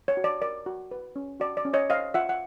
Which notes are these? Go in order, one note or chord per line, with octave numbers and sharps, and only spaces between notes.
C#5
F#4
D5
A#4 D5
F#4
B4
C#4
F#4 D5
D5
C#4
C#5 D#5
C5 D#5 F5
F4 E5 F#5
F#5